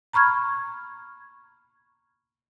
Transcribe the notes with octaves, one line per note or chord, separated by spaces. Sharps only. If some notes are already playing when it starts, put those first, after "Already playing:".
A#5 B5 C#6 F6 G#6